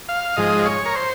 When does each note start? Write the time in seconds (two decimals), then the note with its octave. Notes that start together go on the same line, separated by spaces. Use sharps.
0.09 F5
0.36 G#2 F3 G#3 D#5
0.66 C#5
0.85 A#4
0.95 C5